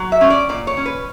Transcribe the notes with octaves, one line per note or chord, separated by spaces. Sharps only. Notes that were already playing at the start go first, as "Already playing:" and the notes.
Already playing: F#3
E5
C#4
D5
A#2 D5
C#5
C#4
B4